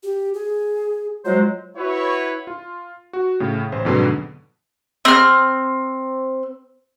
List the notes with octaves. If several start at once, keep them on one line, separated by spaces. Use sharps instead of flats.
G4
G#4
F#3 G#3 F4 C5
E4 F#4 B4 C#5
F4
F#4
A2 C#3
A1 C5
F2 G#2 B2 D3 F#3 B3
C4 F6